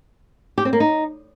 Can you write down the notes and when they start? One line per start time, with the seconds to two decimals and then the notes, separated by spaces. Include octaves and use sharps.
0.58 G4
0.65 C4
0.73 A#3
0.80 D#4